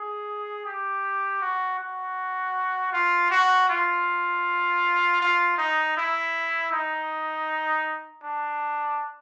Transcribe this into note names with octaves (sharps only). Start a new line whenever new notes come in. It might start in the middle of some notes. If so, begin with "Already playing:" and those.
Already playing: G#4
G4
F#4
F#4
F4
F#4
F4
F4
D#4
E4
D#4
D4